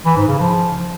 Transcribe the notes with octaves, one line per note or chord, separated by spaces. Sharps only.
E3
G#2
C#3
F3